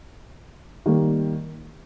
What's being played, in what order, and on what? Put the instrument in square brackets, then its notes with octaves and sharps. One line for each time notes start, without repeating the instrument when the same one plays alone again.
[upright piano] D#3 G3 A#3